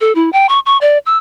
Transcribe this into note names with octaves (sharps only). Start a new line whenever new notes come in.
A4
E4
G5
C#6
C#6
D5
E6